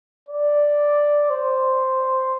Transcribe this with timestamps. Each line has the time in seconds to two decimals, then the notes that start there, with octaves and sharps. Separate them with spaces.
0.29 D5
1.30 C5